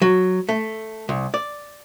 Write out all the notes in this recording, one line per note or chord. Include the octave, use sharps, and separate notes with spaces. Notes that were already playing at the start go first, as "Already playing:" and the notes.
F#3
A3
C2
D5